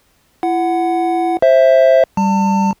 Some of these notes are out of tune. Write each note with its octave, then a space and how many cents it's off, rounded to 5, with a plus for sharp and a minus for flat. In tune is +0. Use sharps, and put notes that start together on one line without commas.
E4 +35 F#5 +0
C5 +15 E5 +0
G3 +0 A5 +35